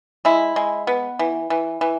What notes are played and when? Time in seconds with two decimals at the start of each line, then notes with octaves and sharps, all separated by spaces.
0.25 G#3 E4
0.56 G#3
0.87 B3
1.19 E3
1.50 E3
1.81 E3